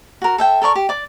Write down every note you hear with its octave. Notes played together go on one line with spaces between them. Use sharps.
F#4 A#4
A4 E5 G5
A4 A#4 D5 C#6
G4
D5 D6